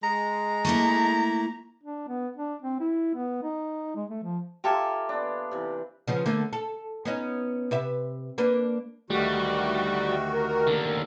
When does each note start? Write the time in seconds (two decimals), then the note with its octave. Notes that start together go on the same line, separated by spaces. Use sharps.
0.03 G#3 A#5
0.65 A3 A#3 E4
1.84 D4
2.08 B3
2.36 D4
2.62 C4
2.81 E4
3.15 B3
3.43 D#4
3.96 G#3
4.10 A3
4.23 F3
4.64 F4 G4 A4 E5 G#5 A#5
5.09 B3 D4
5.51 C3 E3
6.07 C#3 F3 B3
6.26 D3 A3 A#3
6.53 A4
7.05 B3 C#4 D#4
7.71 C3 B4 E5
8.38 A#3 D4 B4
9.10 D2 D#3 G3 A3 F#4 G4
10.32 A#4
10.67 D#2 D3